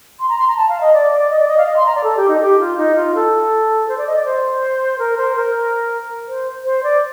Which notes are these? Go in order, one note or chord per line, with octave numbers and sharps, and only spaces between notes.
C6
A#5
C6
A#5
A5
F5
D#5
D5
D5
D#5
D5
D#5
F5
D#5
C6
A#5
D5
A4
G4
D#4
G4
F4
D#4
F4
A4
C5
D5
D#5
D5
C5
A#4
C5
A#4
C5
C5
D5